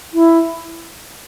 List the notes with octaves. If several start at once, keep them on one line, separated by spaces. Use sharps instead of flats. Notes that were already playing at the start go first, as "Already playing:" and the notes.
E4